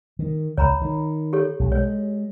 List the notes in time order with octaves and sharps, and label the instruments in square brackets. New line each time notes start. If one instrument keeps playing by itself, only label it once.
[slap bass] D#3
[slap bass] C#2 [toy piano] C#5 A#5 B5
[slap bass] D#3
[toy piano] G4 A4 C#5
[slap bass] B1
[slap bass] G#3 [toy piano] C#5